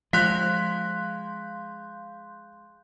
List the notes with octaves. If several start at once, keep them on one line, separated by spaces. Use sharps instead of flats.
F3 G#3 F5 C6 F#6 G6 B6